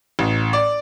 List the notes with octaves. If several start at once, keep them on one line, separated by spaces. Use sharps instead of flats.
A1
D5